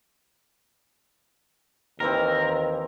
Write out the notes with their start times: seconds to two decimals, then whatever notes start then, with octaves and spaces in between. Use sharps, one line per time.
2.00 D#2 D#3 E3 C4 A#4